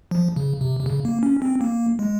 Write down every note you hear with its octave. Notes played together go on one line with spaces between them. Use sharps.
F3
C#3
C3
C3
C#3
A#3
C#4
C4
A#3
G#3